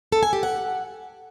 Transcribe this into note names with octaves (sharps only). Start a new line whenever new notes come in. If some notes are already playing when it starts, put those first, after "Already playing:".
A4
G#5
G4
F#5